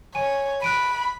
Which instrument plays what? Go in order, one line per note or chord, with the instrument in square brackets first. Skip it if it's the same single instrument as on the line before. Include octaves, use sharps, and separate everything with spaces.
[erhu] C#5 [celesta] G#5 D#7
[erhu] B5 [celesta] F#6 D7 D#7